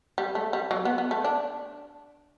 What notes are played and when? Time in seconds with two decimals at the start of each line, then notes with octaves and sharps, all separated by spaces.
0.18 G3
0.35 A3
0.53 G3
0.71 F#3
0.85 B3
0.98 B3
1.11 A3
1.24 D4